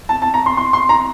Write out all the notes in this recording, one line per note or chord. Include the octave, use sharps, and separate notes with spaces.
A5
A5
A#5
C6
C6
C6
A#5